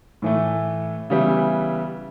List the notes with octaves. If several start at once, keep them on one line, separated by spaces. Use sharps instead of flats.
A2 E3 A3
C#3 E3 G3 B3 E4